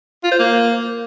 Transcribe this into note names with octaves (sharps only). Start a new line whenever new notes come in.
F4
C5
A#3